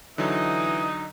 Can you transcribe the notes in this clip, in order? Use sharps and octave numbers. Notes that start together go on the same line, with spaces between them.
D3 E3 F#3 D#4 D#6